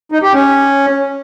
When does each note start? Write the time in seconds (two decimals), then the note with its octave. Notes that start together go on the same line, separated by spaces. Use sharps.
0.12 D#4
0.22 G4
0.33 C#4